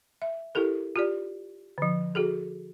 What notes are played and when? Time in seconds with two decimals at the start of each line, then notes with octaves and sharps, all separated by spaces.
0.22 E5
0.55 E4 G4 A4 A#4
0.96 F4 G4 D5
1.78 D3 F3
2.15 F#4 G#4 A4